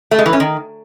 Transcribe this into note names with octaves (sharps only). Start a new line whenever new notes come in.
A3
G#3
E3
C#4
D#3